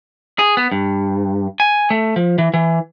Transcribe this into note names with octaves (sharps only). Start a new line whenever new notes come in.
G#4
B3
G2
G#5
A3
F3
E3
E3